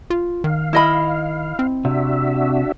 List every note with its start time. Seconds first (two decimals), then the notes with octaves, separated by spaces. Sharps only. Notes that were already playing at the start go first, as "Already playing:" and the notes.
0.10 F4
0.44 D#3 F5
0.73 E4 D#5 B5
1.59 C4
1.85 C3 D4 F#4 E5